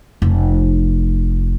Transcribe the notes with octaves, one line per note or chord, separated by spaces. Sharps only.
F1